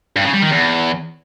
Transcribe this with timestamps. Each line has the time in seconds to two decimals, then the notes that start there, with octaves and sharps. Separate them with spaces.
0.16 G2
0.25 C#3
0.33 G3
0.42 D#3
0.51 E2